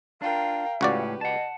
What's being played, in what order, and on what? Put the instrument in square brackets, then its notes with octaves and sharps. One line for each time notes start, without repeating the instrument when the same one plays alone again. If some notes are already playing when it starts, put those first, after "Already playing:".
[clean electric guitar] D4 F4 [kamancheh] A#4 G5 [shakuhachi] F5
[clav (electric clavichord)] C#2 F#4 D5 [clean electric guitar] A2 C#4 [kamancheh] G4 B4
[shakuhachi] D#5 [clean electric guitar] F#5 A5